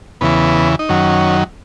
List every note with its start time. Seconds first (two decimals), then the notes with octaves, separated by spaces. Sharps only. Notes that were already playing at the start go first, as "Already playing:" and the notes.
0.21 E2 C#3 E3 B3
0.79 D#4
0.89 F#2 D#3 F#3 C#4